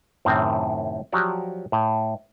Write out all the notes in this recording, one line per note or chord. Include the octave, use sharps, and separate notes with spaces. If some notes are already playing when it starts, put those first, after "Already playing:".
F#2 A2 C3 D#3 C4
F3 F#3 F#4 G4 D5
A2